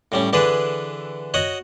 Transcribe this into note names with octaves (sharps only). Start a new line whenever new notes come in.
A2 G3 C#4
D3 E3 D4 G#4 B4
F#4 C#5 D#5 F#5